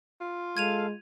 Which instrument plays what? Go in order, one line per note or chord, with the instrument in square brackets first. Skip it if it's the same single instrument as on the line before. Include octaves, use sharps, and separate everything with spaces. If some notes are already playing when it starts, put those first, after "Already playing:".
[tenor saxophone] F4
[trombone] G#3 [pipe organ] A4 F5 [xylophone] G#6 D#7 F7